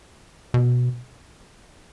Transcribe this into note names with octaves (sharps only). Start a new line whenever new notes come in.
B2